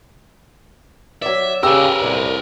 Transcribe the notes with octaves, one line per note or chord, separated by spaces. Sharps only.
F#3 D5 E5
C#3 G4 A#4 B4 F5 E6
C2 A#2